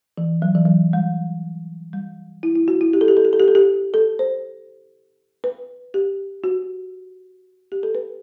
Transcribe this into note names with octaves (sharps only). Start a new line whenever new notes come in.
E3
F#3
E3
F#3
G3
G3
E4
E4
F#4
E4
G4
A4
G4
A4
G4
A4
G4
A4
G4
A4
C5
B4
G4
F#4
G4
A4
B4